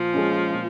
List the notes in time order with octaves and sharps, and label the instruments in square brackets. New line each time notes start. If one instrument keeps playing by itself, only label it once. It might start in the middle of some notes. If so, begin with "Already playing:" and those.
Already playing: [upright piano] A#2 [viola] F3
[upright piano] G#3 C#4
A#2